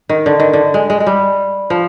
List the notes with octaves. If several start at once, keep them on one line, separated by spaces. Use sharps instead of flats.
D#3
D3
D#3
D3
G#3
G#3
G#3
G3
F3